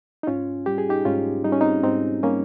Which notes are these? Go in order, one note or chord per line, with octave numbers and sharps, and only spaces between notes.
D#4
G#2 C#4 F4
G3 G4
G#4
D#4 G4
G#2 C#4 F4
G3 D#4
C#4
C4 D#4
G#2 C4 D#4
G3 A#3 C#4